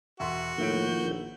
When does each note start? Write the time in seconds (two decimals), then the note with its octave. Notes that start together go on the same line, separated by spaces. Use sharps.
0.20 E1 F#4 E5 C6
0.58 A2 D#3 F3 A#3 E4 G6 D7
1.02 A#1